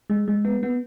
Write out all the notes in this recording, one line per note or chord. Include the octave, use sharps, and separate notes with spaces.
G#3
G#3
B3
B3